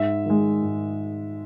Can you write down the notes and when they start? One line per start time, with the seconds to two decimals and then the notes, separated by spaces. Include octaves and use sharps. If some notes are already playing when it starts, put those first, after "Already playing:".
Already playing: G#2 E5
0.26 D#3 G#3
0.62 G#2